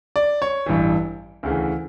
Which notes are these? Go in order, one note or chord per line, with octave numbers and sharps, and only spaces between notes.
D5
C#5
A1 G2 E3
D2 C#3 E3